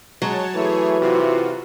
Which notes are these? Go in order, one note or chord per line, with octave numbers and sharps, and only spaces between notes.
F#3 G#3 C#5 A5
E3 A3 G#4 C#5
C3 F4 F#4